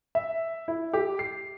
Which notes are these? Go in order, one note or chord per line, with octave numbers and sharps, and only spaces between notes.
E5
E4
G4
C7